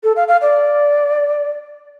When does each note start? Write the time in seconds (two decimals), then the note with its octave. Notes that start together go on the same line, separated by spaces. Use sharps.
0.04 A4
0.16 F5
0.28 F5
0.42 D5